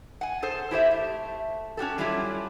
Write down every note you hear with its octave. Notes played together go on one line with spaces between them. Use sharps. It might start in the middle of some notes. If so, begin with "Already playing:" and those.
F#5 G#5
G#4 A4 C5
E4 G4 C5 E5
A3
C#4 F#4 G4 A4
F#3 G3 C#4 E4 F4 G4